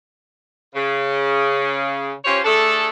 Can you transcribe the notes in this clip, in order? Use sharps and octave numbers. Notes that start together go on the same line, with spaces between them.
C#3
C#4 F4 G4 C5 C#5
A3 D4 G#4 A4